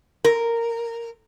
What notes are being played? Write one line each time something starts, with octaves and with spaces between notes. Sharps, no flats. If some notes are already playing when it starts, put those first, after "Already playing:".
A#4